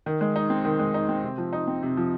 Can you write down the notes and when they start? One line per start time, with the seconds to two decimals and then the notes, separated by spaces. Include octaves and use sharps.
0.06 D#3
0.21 G#3
0.36 D#4
0.50 C4
0.65 D#3
0.79 G#3
0.94 D#4
1.09 C4
1.24 C3
1.38 F3
1.53 D#4
1.67 C4
1.83 C3
1.97 F3